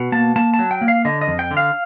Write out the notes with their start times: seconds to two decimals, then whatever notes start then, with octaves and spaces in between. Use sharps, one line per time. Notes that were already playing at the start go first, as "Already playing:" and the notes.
Already playing: B2
0.12 A#3 A5
0.36 A#3 A5
0.54 A5
0.59 F#3
0.71 G5
0.81 A#3
0.88 F5
1.05 D3 D#5
1.21 D#5
1.28 F2
1.39 G5
1.51 D3
1.57 F5